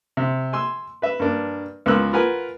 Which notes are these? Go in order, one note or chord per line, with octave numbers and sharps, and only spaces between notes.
C3
G#5 C6 E6
B4 E5
G2 A#3 D4
C#2 B3 A#4 E6 F#6
F4 A#4 B4 F#5 G#5